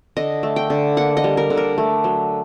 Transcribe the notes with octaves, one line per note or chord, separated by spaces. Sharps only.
D3 D#5
A3
G5
D3
A#3 F#5
D#5
G3
A#4
D3
A#4
A3
F#3